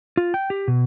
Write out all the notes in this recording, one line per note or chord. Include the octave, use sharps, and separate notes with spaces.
F4
G5
G4
B2